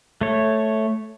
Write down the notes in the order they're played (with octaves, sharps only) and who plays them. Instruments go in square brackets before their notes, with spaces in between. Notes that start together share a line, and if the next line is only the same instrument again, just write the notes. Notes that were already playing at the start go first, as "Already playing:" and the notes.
[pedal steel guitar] A3 C#5